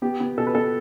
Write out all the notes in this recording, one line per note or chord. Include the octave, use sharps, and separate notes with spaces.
B3 G4
B3
B2 A4
B4
B3 A4